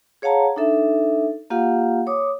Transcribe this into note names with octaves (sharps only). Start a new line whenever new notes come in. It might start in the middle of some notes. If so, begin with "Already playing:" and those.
G#4 C#5 F5 F#5 A5 A#5
D4 D#4 A4 E5
A#3 F4 G4 F5 F#5
C#5 D6 D#6